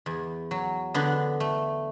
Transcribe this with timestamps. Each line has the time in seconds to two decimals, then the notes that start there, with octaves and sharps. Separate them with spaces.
0.06 E2
0.51 F#3
0.94 D3 B3 D4
1.40 A3